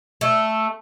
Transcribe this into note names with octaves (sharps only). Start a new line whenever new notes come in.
A3